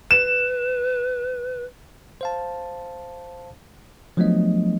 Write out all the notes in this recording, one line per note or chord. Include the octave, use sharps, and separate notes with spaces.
B4 E7
C5 F5 A5
F3 F#3 A3 B3 D4 D#5